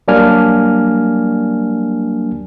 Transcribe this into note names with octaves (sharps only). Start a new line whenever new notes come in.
F#3 G3 A#3 D4 G#5 F6